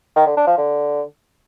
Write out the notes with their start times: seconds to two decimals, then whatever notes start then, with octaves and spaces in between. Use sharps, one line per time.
0.16 D#3
0.26 D3
0.37 D4
0.47 F3
0.58 D3